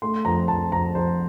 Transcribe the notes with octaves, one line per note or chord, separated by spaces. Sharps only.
A3 C6
F2 A#5
F2 A5
F2 A#5
F2 C5